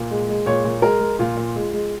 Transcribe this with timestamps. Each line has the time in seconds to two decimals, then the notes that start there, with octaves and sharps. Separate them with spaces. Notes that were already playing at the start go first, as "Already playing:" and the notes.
Already playing: A#2
0.10 G#3
0.28 G#3
0.46 A#2 C#5
0.64 A#2
0.82 G#3 A#4
1.00 G#3
1.19 A#2 F4
1.37 A#2
1.55 G#3
1.73 G#3